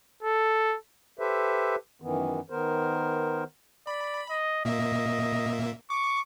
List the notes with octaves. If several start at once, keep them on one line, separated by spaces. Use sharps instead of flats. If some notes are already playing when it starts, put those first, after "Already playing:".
A4
G4 A4 B4 C5 E5
F#2 D#3 E3 B3
D#3 B3 A#4 C5
D5 B5
D#5
A#2 A#3 D#5 E5
C#6 D6